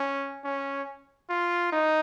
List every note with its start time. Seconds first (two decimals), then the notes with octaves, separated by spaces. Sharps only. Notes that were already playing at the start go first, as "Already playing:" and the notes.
Already playing: C#4
0.44 C#4
1.29 F4
1.72 D#4